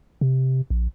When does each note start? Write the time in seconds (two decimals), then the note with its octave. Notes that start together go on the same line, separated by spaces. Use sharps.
0.21 C3
0.70 A#1